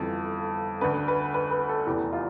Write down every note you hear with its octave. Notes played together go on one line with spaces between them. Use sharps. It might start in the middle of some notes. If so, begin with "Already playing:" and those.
Already playing: G1 F2 E3 A4
D2 D3 B4
B4
B4
B4
A4
F1 E2 C3 E3 G4
F4